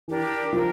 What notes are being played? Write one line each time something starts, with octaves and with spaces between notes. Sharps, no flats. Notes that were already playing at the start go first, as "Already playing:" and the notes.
E3 D4 G4 A#4
F3 D4 G4 A#4